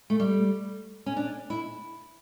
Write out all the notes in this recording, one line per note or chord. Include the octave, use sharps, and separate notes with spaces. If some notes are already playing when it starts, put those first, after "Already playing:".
A3
G3
C#4
D4
E4